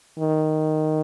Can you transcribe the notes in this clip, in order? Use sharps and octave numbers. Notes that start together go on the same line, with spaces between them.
D#3